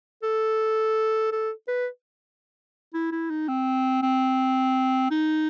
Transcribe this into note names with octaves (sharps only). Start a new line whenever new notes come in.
A4
A4
B4
E4
E4
D#4
C4
C4
D#4